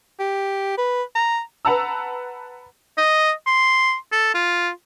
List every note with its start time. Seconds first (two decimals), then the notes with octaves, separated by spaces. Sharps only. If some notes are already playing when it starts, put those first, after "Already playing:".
0.19 G4
0.78 B4
1.15 A#5
1.65 B4 F#5 A5 A#5 E6
2.97 D#5
3.46 C6
4.12 A4
4.34 F4